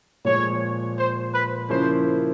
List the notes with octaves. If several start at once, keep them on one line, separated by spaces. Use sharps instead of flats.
A#2 F3 G#3 C#5
C5
B4
C#3 F3 A#3 C#4 E4 C5